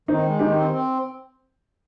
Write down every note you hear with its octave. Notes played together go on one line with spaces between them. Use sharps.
D#3 C4 D#4
G#3
D#3 D#4 G4
C4
C4